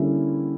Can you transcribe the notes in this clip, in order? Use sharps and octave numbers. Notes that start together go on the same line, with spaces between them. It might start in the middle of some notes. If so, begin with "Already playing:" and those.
Already playing: D3 G3 A#3 C#4 E4